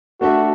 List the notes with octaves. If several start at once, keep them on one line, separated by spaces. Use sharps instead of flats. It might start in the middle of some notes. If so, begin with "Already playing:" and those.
A3 D4 F#4 A4 E5